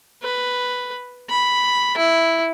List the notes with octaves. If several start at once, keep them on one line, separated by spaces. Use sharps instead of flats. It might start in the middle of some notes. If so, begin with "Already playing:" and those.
B4
B5
E4